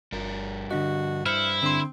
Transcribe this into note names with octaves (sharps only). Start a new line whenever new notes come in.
G1 G2 A#4
D3 D4 F#4 D#5
E4 C5 F6 C#7
D3 C4 D4 C6